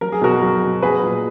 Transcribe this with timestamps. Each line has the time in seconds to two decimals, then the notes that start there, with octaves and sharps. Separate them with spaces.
0.01 F#3 A#4
0.12 G#4
0.22 B2 F#4 A#4
0.42 F#3
0.63 B2
0.82 F#3 G#4 B4
1.03 A#2